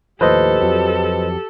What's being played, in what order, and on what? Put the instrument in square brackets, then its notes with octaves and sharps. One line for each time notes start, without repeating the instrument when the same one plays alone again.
[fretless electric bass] D#2 A2 F3 [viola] G4 A4 [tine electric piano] B4 C5 D#5
[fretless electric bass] F2 F3 F#3